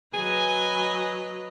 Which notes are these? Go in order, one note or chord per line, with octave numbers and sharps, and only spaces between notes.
F#3 B4 D#5 G#5